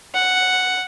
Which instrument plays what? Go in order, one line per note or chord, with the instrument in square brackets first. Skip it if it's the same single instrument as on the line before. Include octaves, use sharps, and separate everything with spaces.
[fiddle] F#5